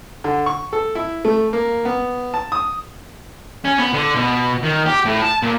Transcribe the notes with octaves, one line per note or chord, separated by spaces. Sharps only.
D3
C#6
A4
E4
A3
A#3
B3
A5
D#6
C#4
B3
D3
B2
D#3
G4
A2
A5
A#2